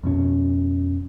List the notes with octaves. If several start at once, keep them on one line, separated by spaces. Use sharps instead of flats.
F2 B2 C#4